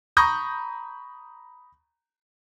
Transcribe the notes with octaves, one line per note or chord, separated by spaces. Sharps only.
A#5 B5 C#6 D#6 G6 A#6